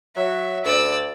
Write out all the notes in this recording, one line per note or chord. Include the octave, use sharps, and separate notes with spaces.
F#3 E5
D2 D5 E6